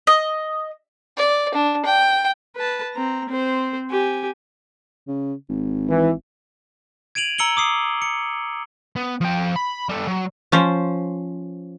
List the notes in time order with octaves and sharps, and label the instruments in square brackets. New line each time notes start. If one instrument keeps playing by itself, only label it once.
[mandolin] D#5
[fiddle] D5
D4
G5
[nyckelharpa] B4 A5
C4 A#5
C4 C5
G4 G#5
[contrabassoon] C#3
G#1
[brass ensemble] E3
[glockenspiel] G#6 D7 D#7 F7 F#7
A#5 E6 C#7 F#7 G7
D6 D#6 C7
C#7
[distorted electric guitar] B3
F3 G5
B5
G3 A4
F#3
[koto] F3 C#4 C5